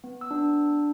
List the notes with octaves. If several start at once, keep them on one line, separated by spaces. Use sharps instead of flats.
B3
E6
D4